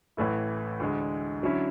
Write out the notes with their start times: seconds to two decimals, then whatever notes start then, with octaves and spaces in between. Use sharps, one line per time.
0.17 A1 A2 E3 A3 E4
0.80 D2 D3 G#3
1.42 D3 F#3 C#4 E4